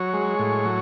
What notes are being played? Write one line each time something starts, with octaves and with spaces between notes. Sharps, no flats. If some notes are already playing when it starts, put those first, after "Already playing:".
Already playing: F#3 C#5
G#3
A2
F#3